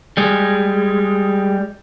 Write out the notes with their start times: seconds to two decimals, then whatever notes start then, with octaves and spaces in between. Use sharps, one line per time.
0.17 G3 G#3